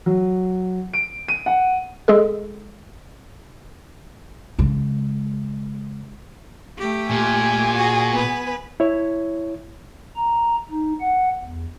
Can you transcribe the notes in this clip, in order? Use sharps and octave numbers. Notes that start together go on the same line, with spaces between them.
F#3
D7
D#7
F#5
G#3 G#4 A4
C#3 G#3
A3 G4
A#2 G#5
F#4 G#4
B3 B4
E4 C#5
A#5
D#4
F#5
E2